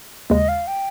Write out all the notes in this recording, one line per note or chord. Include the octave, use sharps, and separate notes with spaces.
D#2 C#3 G#3 D#5
F5
G5